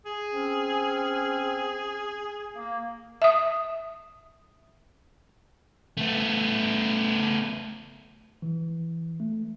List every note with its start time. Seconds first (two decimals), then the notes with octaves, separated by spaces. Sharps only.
0.05 G#4
0.32 C4 C#4
2.54 A#3
3.22 E5 D#6
5.97 A3 B3
8.42 E3
9.20 A3